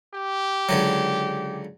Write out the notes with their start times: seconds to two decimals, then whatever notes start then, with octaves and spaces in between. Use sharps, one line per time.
0.14 G4
0.69 C#2 D3 F#3